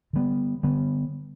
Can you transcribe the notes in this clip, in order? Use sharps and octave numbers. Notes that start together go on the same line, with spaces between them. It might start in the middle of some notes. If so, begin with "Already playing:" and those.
D3 G3 B3
D3 G3 B3